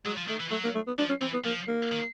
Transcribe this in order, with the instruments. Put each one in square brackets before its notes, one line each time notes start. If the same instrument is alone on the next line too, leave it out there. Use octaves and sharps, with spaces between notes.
[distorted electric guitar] F#3 [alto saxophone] G#3
[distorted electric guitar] F3
[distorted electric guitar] D#3 [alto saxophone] A3
[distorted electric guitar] E3
[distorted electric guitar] F#3 [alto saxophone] A3
[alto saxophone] A#3
A3
B3
[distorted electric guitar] F3 [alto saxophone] D4
[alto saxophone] C#4
[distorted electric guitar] E3 [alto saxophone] C4
[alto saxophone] B3
[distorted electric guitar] F3 [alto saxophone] A#3
[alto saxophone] A#3
[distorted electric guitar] D#3